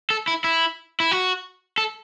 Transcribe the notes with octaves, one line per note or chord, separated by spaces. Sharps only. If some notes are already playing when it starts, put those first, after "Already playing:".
A4
E4
E4
E4
F#4
A4